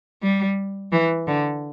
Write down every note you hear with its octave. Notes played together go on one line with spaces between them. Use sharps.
G3
E3
D3